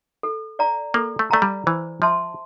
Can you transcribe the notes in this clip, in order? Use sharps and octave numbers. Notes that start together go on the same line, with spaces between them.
A4
D5 F5 A#5
A#3 A4
A3
A3 D5 F5 A#5
G3
E3 C5
F3 E5 A5 C6